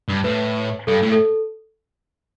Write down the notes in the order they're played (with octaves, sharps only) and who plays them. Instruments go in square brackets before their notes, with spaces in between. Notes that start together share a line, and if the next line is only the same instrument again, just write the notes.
[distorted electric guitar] G2
[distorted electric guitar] A2 [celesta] B4
[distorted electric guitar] G2 [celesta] A4
[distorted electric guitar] A2
[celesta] A4